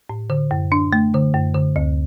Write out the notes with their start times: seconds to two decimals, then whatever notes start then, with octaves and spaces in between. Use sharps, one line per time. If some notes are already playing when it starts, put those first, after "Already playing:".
0.10 A2
0.30 D3
0.51 F#2
0.72 D4
0.93 A3
1.14 D3
1.35 F#2
1.55 D3
1.76 D2